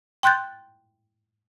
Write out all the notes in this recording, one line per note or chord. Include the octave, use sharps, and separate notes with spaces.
G5 C6 F#6 G6 A6